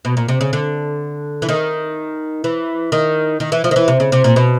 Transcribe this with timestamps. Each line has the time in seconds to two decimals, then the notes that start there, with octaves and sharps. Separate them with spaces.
0.05 B2
0.17 A#2
0.28 C3
0.41 C#3
0.53 D3
1.42 E3
1.49 D#3
2.44 E3
2.92 D#3
3.40 D#3
3.52 E3
3.64 F3
3.71 D#3
3.76 E3
3.88 C3
4.00 C#3
4.12 C3
4.24 A#2
4.36 B2